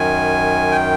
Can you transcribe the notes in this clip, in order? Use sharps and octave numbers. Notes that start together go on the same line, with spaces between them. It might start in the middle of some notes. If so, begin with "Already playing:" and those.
Already playing: F#2 D#3 G#5
G5